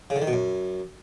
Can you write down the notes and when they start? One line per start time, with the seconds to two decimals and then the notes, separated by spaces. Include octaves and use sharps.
0.10 C#3
0.16 D3
0.22 D#3
0.27 B2
0.33 F#2